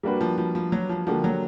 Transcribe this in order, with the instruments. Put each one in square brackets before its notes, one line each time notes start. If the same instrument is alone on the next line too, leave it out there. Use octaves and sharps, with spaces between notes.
[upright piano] G3 A#3 D4 F#4 B4
[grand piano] F3
F3
F3
F#3
F3
[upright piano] D3 G3 A#3 D4 F#4 [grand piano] F3
[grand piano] F#3